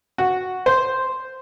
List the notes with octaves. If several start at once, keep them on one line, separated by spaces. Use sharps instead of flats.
F#4
C5